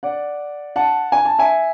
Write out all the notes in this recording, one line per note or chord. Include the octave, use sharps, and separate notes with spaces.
D5 F#5
F#5 A5
G#5
A5
E5 G#5